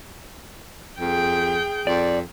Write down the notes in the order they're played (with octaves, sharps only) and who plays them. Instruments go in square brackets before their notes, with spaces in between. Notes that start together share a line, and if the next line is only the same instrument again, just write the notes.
[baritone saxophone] F2 [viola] G#4 G5
[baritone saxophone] F2 [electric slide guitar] D5